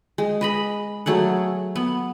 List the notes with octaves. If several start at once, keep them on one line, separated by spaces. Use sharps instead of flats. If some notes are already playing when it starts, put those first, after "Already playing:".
G#3
B4 D#5 B5
F#3 A3 G#4 F#5
B3